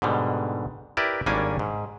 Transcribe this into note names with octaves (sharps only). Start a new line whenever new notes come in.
G#2 B2 D3 G3
E4 G4 A#4 B4 D5
G#1 G3 A#3 C#4 D4 G#5
G#2